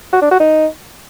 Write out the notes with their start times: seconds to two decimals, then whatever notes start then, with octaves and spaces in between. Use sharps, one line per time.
0.13 F#4
0.22 D4
0.31 F#4
0.40 D#4